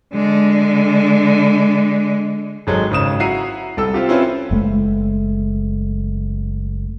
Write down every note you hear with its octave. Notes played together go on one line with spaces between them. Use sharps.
D3 G#3
G#1 F#3 G#3 A4
G#1 C#3 D#6 E7
E4 F#4 E5 A#5 C7 D#7
C2 A4 E6
C4 F4 G4
C4 C#4 E4 F4 B4 C5
F#1 G#3 A3